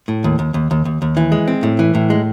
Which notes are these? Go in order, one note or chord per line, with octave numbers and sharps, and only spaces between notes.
A2
D#2
D#2
D#2
D#2
D#2
D#2
E3
G#3
C4
A2
E3
A2
G#3